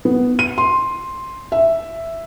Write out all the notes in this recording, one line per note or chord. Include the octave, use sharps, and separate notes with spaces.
B3
D#7
C6
E5